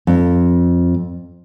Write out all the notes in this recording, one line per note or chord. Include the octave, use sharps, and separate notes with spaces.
F2